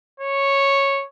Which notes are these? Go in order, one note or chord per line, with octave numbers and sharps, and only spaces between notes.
C#5